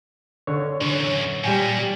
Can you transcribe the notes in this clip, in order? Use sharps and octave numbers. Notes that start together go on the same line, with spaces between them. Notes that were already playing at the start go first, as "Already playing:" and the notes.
D3 C#5
F#2 E3 C#5
A#2 G3 G5 G#5